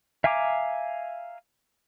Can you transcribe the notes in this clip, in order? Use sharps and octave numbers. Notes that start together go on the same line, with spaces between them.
E5 F5 G#5 A#5 D6